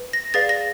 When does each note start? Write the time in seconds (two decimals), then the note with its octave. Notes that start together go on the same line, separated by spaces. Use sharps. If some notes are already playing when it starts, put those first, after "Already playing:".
Already playing: B4
0.13 A#6
0.34 G#4 B4 D5 F5 A6
0.49 A#6